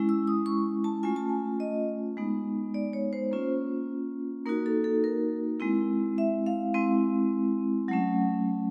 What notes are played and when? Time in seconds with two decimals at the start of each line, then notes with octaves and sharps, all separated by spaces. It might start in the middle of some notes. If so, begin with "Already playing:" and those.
Already playing: G#3 C#4 E4
0.09 E6
0.28 D#6
0.46 C#6
0.84 A5
1.03 A3 C#4 F4 G#5
1.16 A5
1.29 G#5
1.60 D#5
2.17 G#3 B3 D#4
2.74 D5
2.93 C#5
3.13 C5
3.31 A#3 C#4 F4
4.46 A#3 D#4 F#4 A#4
4.66 A4
4.84 A4
5.04 A#4
5.60 G#3 C4 E4
6.18 E5
6.46 F5
6.74 G#3 C4 E4
7.88 F#3 A3 C#4 F#5